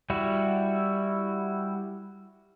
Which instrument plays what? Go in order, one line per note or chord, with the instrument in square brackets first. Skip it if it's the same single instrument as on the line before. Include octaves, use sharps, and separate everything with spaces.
[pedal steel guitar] G3 E4 F#4